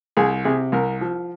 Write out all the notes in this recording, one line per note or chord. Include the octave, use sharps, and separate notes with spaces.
C2 G#4
C3 G#4
C2 A#4
F3